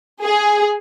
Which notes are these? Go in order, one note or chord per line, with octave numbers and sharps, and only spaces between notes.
G#4